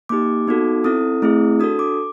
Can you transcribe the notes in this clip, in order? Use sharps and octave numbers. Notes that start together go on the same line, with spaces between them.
A#3 D#4 G4 D6
B3 D#4 F#4 A4
C4 E4 A4 D#6
A3 C4 E4 G#4
D4 F#4 A4 D#6
D6